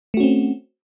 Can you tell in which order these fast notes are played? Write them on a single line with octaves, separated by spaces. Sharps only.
A3 F#4 C#4 C4